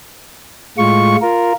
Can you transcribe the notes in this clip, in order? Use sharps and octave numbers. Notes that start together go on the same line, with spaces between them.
A2 G#3 F4 C#6
F4 A#4